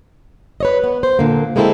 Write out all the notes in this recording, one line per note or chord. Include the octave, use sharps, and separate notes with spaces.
B4 C#5 D#5
B3
C5
A#2 D3 A#3
G#3 A#3 C4 E4 G#4 A4